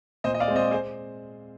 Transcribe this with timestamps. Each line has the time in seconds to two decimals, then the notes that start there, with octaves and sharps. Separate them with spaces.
0.24 A#2 C5 D#5
0.34 D#5
0.40 D5 F5
0.48 G#3 C4
0.56 C5 D#5
0.71 G#4 C5